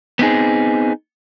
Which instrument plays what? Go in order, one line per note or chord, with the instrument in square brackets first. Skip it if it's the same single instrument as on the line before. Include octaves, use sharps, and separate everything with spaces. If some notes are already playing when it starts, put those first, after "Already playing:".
[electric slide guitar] B3 C4 D#4 G#4